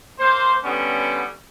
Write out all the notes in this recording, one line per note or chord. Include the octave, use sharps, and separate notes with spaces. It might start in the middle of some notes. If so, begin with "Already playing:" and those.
A#3 C5
D3 G3 B3 C#4